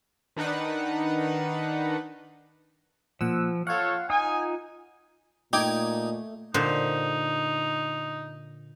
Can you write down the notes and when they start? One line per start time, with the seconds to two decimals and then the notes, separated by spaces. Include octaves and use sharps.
0.36 D#3 D4 D#4 B4 F#5
3.21 A#2 F3 F#5 E6
3.67 F4 A4 C#5 F5 F#5
4.10 D#4 G#5 D#6
5.53 A#2 A3 D#4 G5 D6 G#6
6.54 A#2 D3 D#4 C5